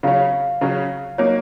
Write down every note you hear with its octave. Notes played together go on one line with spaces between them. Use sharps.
C#3 F#3 C#4 F5
C#3 F#3 C#4
F#3 A#3 D#4 C#5